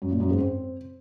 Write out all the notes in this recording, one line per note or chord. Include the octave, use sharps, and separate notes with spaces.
F#2
A#2
F#2
G#2
C4